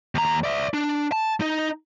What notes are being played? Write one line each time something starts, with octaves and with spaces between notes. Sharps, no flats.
D#2 A#5
D5 E5
D4
A5
D#4 D#5